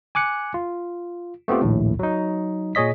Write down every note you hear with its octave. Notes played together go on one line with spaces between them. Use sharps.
G#5 D6 F#6 C#7
F4
A3 B3 C4 F4 G4
A#1 D#2 A2
F#3 D#4
A#2 G#4 C#5 D#5 B6